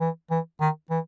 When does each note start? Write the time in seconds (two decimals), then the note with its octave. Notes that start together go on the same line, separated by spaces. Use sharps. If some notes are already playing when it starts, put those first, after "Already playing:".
0.01 E3
0.31 E3
0.61 D#3
0.90 E3